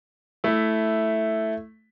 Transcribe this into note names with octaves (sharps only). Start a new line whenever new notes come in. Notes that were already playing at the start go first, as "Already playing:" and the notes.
A3 E4